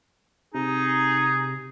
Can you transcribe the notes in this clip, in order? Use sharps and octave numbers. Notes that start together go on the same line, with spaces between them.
C3 D#4 G#4